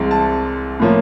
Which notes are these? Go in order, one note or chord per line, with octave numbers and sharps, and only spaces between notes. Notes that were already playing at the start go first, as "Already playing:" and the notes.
Already playing: C2 E3 G#3 C4
A5
A2 F3 A#3 C#4